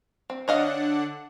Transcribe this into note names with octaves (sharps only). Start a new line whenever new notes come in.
C4
D3 D4 C#5 D#5 F5 F#5